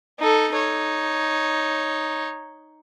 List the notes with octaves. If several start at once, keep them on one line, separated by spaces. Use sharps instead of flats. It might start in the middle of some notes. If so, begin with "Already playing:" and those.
D#4 A4
D#4 C#5